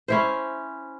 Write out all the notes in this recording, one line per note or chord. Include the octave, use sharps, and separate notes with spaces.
C#4 E4 C5